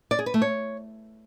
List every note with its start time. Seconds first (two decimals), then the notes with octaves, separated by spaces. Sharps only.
0.11 D5
0.19 G#4
0.26 B4
0.34 A3
0.42 C#5